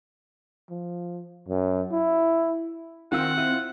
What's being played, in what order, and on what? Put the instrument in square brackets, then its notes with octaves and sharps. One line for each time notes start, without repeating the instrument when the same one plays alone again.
[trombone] F3
F#2
E4
[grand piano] D#3 F4 E6 [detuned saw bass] C4 [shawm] F#5
[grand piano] E4 F4